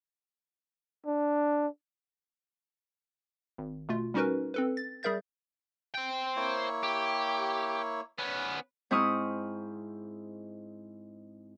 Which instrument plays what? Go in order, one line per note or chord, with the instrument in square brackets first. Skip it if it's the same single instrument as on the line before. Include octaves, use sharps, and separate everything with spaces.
[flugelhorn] D4
[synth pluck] G#1
B2 A3 F4
G3 C#4 D#4 F#4 A#4 B4
C4 A4 B4
A6
G3 G#4 A#4 E5 G6 A6
[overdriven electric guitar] C5 G5
[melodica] A#3 E4 C#5
[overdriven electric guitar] G4
[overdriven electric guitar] B3 C#4 [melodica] B4
[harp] G#2 C4 E4 C#6 D#6 F6